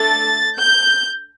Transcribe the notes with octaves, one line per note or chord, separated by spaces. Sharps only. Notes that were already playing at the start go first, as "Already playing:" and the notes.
Already playing: A3 D4 A4 A6
G6